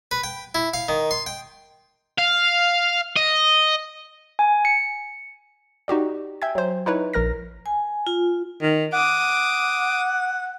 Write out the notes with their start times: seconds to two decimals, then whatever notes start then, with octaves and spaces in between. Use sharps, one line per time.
0.11 B4
0.24 G5
0.55 E4
0.74 F5
0.89 D#3
1.11 C6
1.26 G5
2.18 F5
3.17 D#5
4.39 G#5
4.65 C#7
5.88 D#4 F#4 G4 D5
6.42 E5 G5 G#5 G#6
6.55 F#3 C5
6.86 D#4 E4 B4 C#5
7.13 A#1 A#4 F6 A#6
7.66 G#5
8.07 F4
8.62 D#3
8.93 F#5 D6 D#6